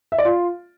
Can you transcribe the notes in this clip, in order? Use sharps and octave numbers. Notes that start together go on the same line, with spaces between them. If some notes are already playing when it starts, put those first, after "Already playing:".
E5
D5
F4